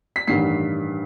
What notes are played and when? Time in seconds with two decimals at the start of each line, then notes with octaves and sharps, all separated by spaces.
0.16 B6
0.27 A1 G2 D#3 G3 C7